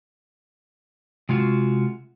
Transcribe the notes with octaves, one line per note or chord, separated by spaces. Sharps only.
C3 G#3 F4 F#4